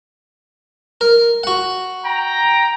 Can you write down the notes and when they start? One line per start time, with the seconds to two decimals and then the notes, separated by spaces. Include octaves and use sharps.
1.01 A#4
1.43 F#4 F#5
2.04 G5 A#5